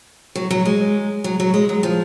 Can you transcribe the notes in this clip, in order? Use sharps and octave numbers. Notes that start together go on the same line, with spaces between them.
F#3
F#3
G#3
F#3
F#3
G#3
F#3
F3